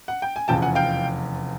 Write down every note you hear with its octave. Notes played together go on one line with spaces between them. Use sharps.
F#5
G5
G#5
F1 E2 C#3 F3 G5 A5
F#5 G#5
F5 G5